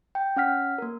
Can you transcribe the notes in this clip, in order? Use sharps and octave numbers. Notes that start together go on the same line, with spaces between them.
G5
C#4 F#5 F6 B6
A#3 A#4